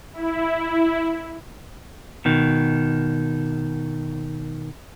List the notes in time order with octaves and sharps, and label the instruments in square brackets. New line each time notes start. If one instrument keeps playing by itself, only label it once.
[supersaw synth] E4
[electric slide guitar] B2 D#3